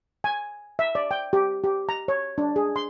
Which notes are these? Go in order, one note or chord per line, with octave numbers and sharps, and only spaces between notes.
G#5
E5
D5
G5
G4
G4
A#5
C#5
D4
G#4
C6